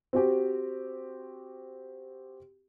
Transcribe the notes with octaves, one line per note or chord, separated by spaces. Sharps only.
C4 F#4 G4